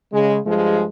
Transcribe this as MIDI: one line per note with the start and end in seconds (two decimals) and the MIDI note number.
0.13 0.38 49
0.13 0.38 56
0.46 0.85 43
0.46 0.85 53
0.46 0.85 56